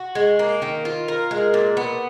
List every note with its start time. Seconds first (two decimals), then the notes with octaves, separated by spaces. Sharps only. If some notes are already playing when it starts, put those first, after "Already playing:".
Already playing: F#4
0.15 G#3
0.39 A#3
0.62 D#3
0.85 F4
1.08 A#4
1.31 G#3
1.54 A#2
1.77 B3